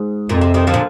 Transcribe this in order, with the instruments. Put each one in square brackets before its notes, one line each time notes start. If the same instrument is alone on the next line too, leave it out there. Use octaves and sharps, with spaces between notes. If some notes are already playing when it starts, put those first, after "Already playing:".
Already playing: [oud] G#2
[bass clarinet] F2 [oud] A#2
[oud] C3
C3 D#3
D3 F3
A#2